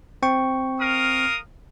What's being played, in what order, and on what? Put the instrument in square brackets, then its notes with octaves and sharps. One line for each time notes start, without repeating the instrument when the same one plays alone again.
[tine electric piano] C4 G5 C#6
[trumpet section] A#4 F5 D#6